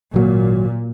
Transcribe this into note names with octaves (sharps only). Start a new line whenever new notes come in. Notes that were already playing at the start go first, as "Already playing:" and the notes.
G#1 A#2 F#3